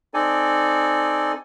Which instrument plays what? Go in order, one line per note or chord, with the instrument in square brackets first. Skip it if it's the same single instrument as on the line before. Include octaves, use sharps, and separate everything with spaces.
[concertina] C4 D#4 A4 D5 G#5